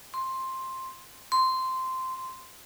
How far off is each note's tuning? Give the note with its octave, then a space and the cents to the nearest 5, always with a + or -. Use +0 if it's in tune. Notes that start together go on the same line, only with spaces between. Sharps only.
C6 +10
C6 -10